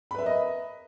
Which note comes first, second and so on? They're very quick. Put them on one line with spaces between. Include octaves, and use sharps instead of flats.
B5 B4 E5 A#4 D#5